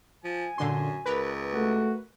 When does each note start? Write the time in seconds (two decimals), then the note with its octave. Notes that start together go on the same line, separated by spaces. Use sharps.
0.24 F3 G#5
0.58 F#2 A#2 D3 C6
1.06 C#2 A#4 B4
1.54 A3 F#4